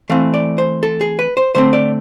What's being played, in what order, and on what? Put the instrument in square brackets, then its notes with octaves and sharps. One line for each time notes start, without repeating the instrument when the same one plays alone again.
[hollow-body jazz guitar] E3 A3 C4 F5
D5
C5
A4
G#4
B4
C5
D3 A3 C4 C5
D5